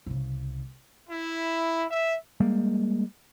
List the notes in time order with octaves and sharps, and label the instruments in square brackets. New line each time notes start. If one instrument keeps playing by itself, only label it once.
[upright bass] C2 C#3
[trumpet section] E4
E5
[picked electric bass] G3 G#3 A#3